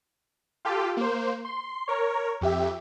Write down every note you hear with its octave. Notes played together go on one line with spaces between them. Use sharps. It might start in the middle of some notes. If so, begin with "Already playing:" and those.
F4 G4 A4
A#3 C5
C6
A#4 C#5
F2 G4 E5